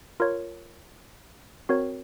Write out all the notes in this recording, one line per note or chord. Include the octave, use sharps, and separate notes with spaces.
F4 A#4 C#5
C4 F#4 A#4 C#5